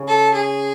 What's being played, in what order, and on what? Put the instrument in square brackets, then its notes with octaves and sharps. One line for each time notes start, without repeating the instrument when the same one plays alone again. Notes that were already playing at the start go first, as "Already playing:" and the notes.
Already playing: [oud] C#3
[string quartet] A4
G#4